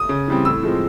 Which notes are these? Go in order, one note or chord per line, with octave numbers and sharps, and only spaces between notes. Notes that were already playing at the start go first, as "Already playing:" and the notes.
Already playing: D#6
C#3
E3 G3 C4
A2 E6
F3 G#3 C4